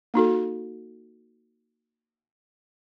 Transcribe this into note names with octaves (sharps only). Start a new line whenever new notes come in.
A#3 D#4 F#4 A4